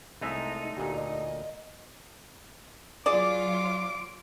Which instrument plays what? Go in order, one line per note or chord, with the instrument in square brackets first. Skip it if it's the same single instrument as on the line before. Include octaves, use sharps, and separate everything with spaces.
[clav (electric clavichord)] C2 G#3 E5 [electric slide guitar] A3 D#4
[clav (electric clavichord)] D2 A#2 [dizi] G4
[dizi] D#5
[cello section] F#3 F4 [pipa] G#4 D5 [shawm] D6